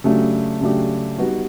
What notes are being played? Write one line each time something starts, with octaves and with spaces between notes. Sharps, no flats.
C#3 F#3 A3 D4 G4
C#3 F#3 A3 D4 G4
G3 B3 D#4 F#4